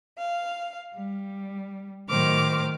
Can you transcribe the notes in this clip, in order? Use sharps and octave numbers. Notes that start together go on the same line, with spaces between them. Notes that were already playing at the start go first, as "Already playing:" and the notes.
F5
G3
A2 D#3 F#3 C5 D6 F6